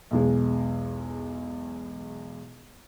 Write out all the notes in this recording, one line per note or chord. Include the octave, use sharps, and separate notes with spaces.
B1 E2 G#3